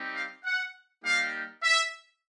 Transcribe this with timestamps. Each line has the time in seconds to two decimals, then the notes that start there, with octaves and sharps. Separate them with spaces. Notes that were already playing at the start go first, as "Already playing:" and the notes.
Already playing: G3 C4 D#4 G4
0.14 F5
0.44 F#5
1.03 G3 A#3 D#4 G4 F5
1.63 E5